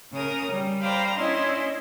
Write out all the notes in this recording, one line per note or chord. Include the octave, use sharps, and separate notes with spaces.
C#3 C#4 A#4 A#5 D#6
G3
C5 D5 F5 G5 A#5 B5
C#4 D4 E4 D#5 C6